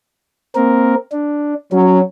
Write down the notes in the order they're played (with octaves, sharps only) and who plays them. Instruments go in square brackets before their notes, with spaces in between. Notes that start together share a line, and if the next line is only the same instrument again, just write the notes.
[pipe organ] A#3 C4 A#4
D4
[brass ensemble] F#3 [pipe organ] C#4